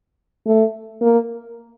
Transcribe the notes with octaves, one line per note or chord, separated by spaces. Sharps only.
A3
A#3